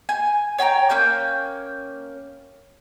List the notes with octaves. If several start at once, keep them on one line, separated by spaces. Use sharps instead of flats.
G#5
C#5 G5 G#5 A#5
A#3 C#4 G5 G6